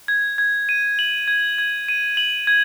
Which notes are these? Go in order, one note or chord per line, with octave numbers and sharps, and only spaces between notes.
G#6
G#6
D#7
F#7
G#6
G#6
D#7
F#7
G#6